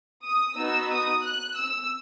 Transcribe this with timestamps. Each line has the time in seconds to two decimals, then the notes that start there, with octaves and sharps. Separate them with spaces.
0.24 D#6
0.57 B3 D#4 F#4 E6
0.91 D#6
1.24 F#6
1.57 E6